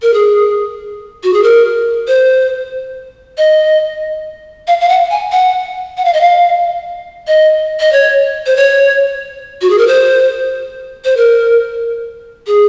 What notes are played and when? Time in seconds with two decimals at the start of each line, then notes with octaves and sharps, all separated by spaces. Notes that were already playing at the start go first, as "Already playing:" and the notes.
0.02 A#4
0.14 G#4
1.23 F#4
1.33 G#4
1.43 A#4
2.07 C5
3.38 D#5
4.67 F5
4.81 F5
4.89 F#5
5.10 G#5
5.32 F#5
5.97 F#5
6.05 F5
6.13 D#5
6.21 F5
7.27 D#5
7.80 D#5
7.92 C#5
8.46 C5
8.57 C#5
9.61 F#4
9.70 G#4
9.78 A#4
9.87 C5
11.05 C5
11.17 A#4
12.47 G#4